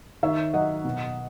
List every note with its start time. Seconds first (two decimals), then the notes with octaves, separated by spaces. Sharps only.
0.23 D#3 C#5 E5
0.54 F#3 D#5 F#5
0.85 B2